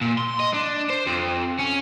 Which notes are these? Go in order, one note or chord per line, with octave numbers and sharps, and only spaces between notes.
A#2
C6
D#5
D4
C5
F2
C#4